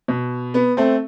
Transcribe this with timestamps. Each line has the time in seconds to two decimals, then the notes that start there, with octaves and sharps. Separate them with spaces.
0.08 B2
0.54 B3
0.77 A3 C4